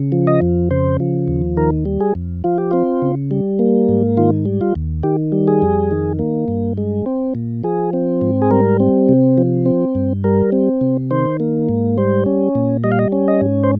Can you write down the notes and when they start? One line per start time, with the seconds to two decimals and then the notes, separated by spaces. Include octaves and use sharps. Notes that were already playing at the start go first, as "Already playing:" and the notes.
Already playing: C#3
0.12 F3
0.27 D#5
0.42 F2
0.71 C#3 C5
1.00 F3
1.28 D#2
1.57 D#3 A#4
1.85 G3
2.00 G#4
2.15 F2
2.44 F3 F4
2.58 G4
2.71 C4 F4
3.02 C#3
3.31 G3
3.59 A#3
3.89 G#2
4.17 D#3 F4
4.45 G3
4.61 F4
4.75 D#2
5.03 D#3 G4
5.32 G3
5.48 G#4
5.62 F2
5.91 D#3
6.19 A#3
6.48 G2
6.78 G#3
7.06 C4
7.35 A#2
7.63 F3 G#4
7.93 C4
8.21 G#2
8.42 G#4
8.51 G3 A#4
8.80 C4
9.09 C3
9.38 F3
9.66 C4
9.95 G2
10.24 G3 A#4
10.52 C4
10.81 C3
11.11 D#3 C5
11.40 A#3
11.69 G#2
11.98 G3 C5
12.26 C#4
12.55 A#2
12.84 G3 D#5
12.92 F5
12.99 D#5
13.12 C#4
13.28 D#5
13.41 G#2
13.64 C5